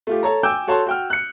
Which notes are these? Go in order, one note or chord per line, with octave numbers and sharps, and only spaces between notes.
A3 F4 G4
A4 C#5 A#5
G5 G#5 D6 E6 G6
F#4 A4 C#5 F#5 A5 C6
F#4 G5 F6
F#6 C#7